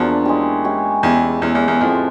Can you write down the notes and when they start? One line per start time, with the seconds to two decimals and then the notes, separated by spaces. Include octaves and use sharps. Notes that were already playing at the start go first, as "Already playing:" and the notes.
Already playing: E2 F3 A#3 D4 F#4
0.25 G#3 C#4 E4 G4
0.64 G#3 C#4 E4 G4
1.03 E2 G#3 C#4 E4 G4
1.42 E2 G#3 C#4 E4 G4
1.55 E2
1.68 E2
1.80 F2 A2 F3 G#3